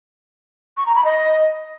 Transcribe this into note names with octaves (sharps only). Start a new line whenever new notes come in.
C#6
A#5
B5
D#5